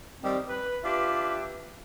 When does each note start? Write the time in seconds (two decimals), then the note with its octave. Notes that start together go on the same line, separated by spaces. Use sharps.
0.23 D#3 G3 C4
0.49 B4
0.84 D4 F4 G4 B4 E5